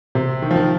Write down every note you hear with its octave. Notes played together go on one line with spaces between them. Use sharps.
C3
D#3
F3
D#3